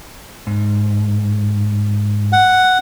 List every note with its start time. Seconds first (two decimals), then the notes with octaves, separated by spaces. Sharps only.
0.47 G#2
2.33 F#5